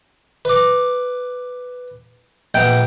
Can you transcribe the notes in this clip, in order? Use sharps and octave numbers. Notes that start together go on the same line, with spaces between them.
B4 D6
A#1 B3 G5 G6